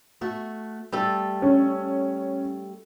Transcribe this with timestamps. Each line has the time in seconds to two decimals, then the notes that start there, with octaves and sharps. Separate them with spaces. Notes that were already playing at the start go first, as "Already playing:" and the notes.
0.21 A3 F#4
0.92 G3 A3 A4
1.42 C#4